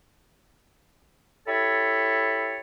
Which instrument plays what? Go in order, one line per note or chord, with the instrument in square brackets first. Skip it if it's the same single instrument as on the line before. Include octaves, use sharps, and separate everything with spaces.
[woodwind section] E4 G4 A4 C#5 A5 B5